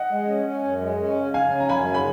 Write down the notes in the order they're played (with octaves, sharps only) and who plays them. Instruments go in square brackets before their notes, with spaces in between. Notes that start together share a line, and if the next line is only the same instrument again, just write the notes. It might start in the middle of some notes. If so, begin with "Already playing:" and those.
Already playing: [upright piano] D#5 F#5
[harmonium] G#3
C#4
C#4
F#2
G#3
C#4
C#3
[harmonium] C#3 [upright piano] F5 G#5
[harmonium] C#4
[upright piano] A#5
[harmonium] F#2 [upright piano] G#5 B5
[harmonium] C#3
[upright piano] B5